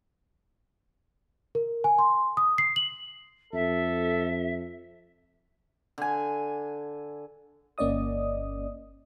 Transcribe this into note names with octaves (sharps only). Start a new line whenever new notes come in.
A#4
G#5
C6
D#6
C7
F#7
F2 A4 E5
D3 G#5
G1 A#3 C#4 D5 D#5 D#6